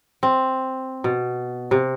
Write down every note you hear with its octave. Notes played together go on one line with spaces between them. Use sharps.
C4
B2
C3